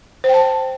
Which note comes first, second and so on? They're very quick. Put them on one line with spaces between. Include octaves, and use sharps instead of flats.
C5 G5 A5